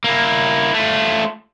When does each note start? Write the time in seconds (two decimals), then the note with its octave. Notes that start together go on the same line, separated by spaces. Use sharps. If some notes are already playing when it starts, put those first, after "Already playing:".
0.04 A#3 E4
0.74 A3 F4